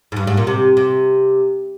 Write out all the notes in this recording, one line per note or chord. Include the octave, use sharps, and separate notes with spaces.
G#2
G2
G#2
A#2
C3
C3